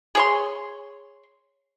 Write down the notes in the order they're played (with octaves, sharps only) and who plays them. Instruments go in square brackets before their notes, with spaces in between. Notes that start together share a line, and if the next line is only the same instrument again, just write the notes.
[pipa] G#4 C#5 C6